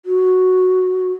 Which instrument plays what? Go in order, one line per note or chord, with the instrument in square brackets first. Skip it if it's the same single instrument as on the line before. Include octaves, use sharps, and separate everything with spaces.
[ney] F#4